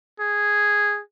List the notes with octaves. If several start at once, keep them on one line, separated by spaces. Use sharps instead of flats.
G#4